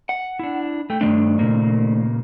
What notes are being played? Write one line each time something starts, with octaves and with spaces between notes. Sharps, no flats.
F#5
D4 E4
A3 G5
G2 D#3 E3 A3 D4
A#2 C#3 A#3